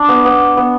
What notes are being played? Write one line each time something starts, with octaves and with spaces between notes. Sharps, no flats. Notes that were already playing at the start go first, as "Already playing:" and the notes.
Already playing: D4
B3
B3
B3